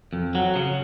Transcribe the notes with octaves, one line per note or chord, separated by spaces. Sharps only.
F2
F#3
C#3